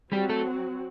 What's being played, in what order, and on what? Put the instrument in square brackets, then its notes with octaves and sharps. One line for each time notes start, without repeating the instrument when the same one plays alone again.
[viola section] F#3 C4 F#4 [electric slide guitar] G3 G4
[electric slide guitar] A3 A4